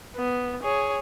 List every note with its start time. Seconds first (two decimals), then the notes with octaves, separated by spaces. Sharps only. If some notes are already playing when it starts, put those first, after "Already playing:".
0.16 B3
0.63 G#4 C#5